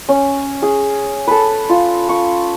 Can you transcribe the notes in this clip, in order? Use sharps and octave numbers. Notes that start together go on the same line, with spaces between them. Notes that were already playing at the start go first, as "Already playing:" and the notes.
C#4
G#4
A4 B4
F4
C#6